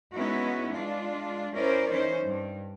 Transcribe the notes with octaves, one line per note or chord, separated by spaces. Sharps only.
G#3 B3 C#4 D#4 E4 F#4
G#3 D4 F4
C#4 E4 A#4 C5 D5
E3 C#4 D#4 C5
G2